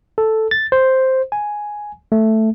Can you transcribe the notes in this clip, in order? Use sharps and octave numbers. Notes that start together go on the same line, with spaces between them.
A4
A6
C5
G#5
A3